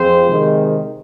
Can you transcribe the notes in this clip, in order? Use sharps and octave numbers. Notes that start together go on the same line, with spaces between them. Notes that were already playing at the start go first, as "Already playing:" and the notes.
Already playing: F2 F3 C4 G#4 C5
C3 D#3 G#3